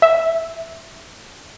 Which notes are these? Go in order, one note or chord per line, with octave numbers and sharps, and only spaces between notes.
E5